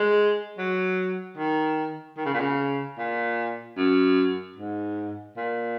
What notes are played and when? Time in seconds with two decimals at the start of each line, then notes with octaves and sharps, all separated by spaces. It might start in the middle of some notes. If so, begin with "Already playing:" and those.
Already playing: G#3
0.58 F#3
1.37 D#3
2.17 D#3
2.25 C#3
2.34 A#2
2.40 C#3
2.98 A#2
3.77 F#2
4.56 G#2
5.36 A#2